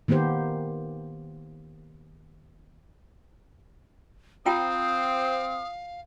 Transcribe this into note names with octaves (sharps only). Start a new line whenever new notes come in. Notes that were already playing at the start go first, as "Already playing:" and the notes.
D#3 A#3 B3 G4 C5
C4 F4 F5 G5 A#5 D#6